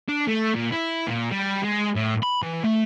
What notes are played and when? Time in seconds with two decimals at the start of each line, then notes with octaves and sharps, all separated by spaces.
0.09 D4
0.28 A3
0.55 A#2
0.72 E4
1.08 A#2
1.32 G3
1.64 G#3
1.96 A2
2.23 B5
2.43 E3
2.64 A3